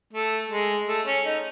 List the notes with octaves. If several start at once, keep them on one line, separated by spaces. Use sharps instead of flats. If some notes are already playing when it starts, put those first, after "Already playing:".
A3
G#3
A3
C#4
D#4